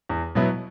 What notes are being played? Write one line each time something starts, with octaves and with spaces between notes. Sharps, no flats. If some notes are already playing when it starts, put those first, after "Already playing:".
E2
B2 F#3 B3 E4